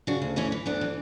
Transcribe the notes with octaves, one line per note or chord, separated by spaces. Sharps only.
C#3 D4 F#4
D2
E3 C#4 E4
E3
D2 B3 D4
E3